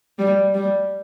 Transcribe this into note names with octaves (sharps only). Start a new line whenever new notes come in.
G3
G3